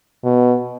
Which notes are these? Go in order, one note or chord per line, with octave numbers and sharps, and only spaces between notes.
B2